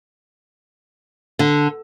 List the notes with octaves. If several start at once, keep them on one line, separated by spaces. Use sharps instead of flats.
D3